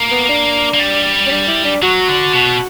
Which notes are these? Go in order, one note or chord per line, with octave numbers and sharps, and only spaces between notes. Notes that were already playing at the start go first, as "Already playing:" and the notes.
Already playing: A#3
B3
D4
A#3
G3
C#4
D4
E4
D4
F#3 F#4
D3
B2